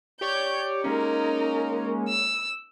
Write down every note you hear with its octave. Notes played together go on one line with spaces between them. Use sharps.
G4 C#5 D5 G6
G#3 A#3 C#4 D#4 A#4
E6